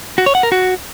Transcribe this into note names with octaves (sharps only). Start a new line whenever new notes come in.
F#4
C#5
F#5
A#4
F#4